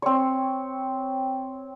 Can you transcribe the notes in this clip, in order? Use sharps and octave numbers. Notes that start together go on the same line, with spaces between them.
C4 C#5